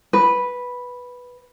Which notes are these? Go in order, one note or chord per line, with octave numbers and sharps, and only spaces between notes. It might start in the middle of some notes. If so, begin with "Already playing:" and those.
B4